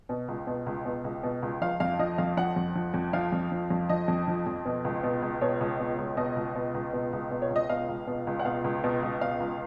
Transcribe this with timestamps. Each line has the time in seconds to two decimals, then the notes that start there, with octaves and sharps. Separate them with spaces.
0.09 B2
0.28 C#2
0.47 B2
0.66 C#2
0.85 B2
1.04 C#2
1.23 B2
1.42 C#2
1.61 F3 F5
1.80 F2 F5
1.99 F3 D#5
2.18 F2 F5
2.37 F3 F#5
2.56 F2
2.75 F3
2.94 F2
3.13 F3 F5
3.32 F2
3.52 F3
3.70 F2
3.89 F3 D#5
4.08 F2
4.28 F3
4.47 F2
4.65 B2
4.85 C#2
5.03 B2
5.22 C#2
5.41 B2 C#5
5.61 C#2
5.80 B2
5.98 C#2
6.17 B2 D#5
6.36 C#2
6.55 B2
6.74 C#2
6.93 B2
7.13 C#2
7.31 B2
7.42 C#5
7.50 C#2
7.56 D#5
7.70 B2 F5
7.89 C#2
8.07 B2
8.27 C#2
8.39 F#5
8.45 B2 F5
8.64 C#2
8.84 B2
9.03 C#2
9.21 B2 F5
9.40 C#2